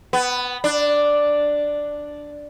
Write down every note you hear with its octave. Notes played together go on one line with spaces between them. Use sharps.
B3
D4